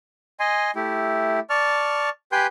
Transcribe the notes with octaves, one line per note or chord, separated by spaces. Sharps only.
D#5 G#5 C6
A3 E4 G4
D5 A5 C#6 F6
G4 B4 G5 G#5 C6 G6